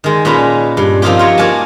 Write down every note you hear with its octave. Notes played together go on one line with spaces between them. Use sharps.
D#3 G#3
A#2 G#3 C#4 B4 A5 A#5
G2
F3 A#3 C4 D#4 F4 G4
F4 C#5 A#5
A#3 F#4 A#4 D5 G#5 A5